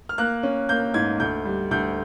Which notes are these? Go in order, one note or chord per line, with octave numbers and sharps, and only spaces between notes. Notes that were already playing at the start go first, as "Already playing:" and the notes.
F6
A#3 F#6
C#4
A#3 G6
G#2 G#6
D2 G6
G3
D2 G6